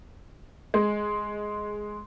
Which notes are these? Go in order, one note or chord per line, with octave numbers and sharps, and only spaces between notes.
G#3